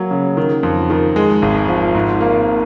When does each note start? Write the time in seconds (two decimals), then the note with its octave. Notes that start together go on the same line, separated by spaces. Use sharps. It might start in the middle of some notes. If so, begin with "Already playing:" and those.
Already playing: F#3 A#3
0.11 C#3
0.37 D#3
0.63 F2
0.90 D#3
1.16 G#3
1.42 G#1
1.68 F3
1.95 G#2
2.21 A#3